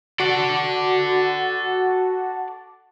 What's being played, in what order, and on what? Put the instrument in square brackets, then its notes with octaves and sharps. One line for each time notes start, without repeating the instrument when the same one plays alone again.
[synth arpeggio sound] F#4 [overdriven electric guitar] A4 D5